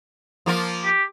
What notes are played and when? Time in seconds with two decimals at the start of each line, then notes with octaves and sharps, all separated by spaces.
0.46 F3 A#3 F4
0.84 G4